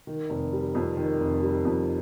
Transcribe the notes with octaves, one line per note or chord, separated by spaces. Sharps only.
D#3
F1
G3
F2
D#3
F1
G3
F2